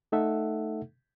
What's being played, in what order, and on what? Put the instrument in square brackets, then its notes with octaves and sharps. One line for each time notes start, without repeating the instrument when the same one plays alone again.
[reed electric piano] A3 D#4 A4 E5 F#5